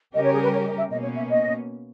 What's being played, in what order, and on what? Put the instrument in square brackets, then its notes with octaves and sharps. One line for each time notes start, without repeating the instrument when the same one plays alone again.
[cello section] C#3 G3 C#4 G4 A#4 [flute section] D#5
[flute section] C#5
G#4
B4
C#5
D#5
E5
[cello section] B2 A#3 C#4 [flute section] D#5
[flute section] C#5
E5
D#5